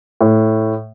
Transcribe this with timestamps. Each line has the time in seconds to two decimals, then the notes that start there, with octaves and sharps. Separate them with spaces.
0.21 A2